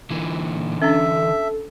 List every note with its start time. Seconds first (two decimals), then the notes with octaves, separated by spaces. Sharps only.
0.10 A#2 D3 E3
0.82 C#4 D4 A4 E5